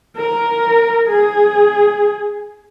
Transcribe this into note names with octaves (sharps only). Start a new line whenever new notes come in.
A#4
G#4